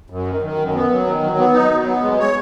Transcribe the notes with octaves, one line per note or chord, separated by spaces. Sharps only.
F#2
D#3
D#3
F#2
B3
F#3
D#3
F#3
B3
D#4
F#3
B3
G#3
C#5